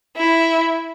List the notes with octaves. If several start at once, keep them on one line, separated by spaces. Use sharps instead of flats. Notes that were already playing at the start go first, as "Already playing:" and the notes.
E4